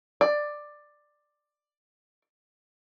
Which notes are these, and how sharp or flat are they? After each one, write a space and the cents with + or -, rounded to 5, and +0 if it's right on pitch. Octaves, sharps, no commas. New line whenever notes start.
D5 +10